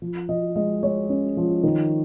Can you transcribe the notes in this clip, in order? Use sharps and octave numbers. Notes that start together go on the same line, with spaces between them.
F3
F3 D#5
G#3 D#5
G#3 C#5
C#4
F3
D#3